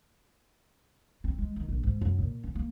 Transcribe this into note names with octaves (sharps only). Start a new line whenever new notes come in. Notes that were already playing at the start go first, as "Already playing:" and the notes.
C4
G#3
D#3
A#1
G#2
F#2
A#2
C#4
A#3